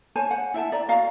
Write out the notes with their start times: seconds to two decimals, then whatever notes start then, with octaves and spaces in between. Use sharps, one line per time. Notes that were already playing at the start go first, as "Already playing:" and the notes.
0.16 C5 C#5 G#5 A5
0.31 F#5
0.54 E4 E5 G5 A5
0.72 D5 A#5
0.88 F#4 D#5 F5 A#5